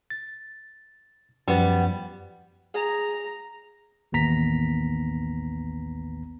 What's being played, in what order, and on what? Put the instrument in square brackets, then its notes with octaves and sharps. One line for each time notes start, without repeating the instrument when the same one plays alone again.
[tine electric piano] A6
[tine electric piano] F#2 F3 [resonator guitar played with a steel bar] G3 B3
[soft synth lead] G#4 [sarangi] A#5
[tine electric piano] A1 D#2 B3 A#5 B6